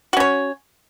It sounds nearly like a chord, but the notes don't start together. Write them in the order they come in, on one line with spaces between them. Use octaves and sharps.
F#4 C#4 C#5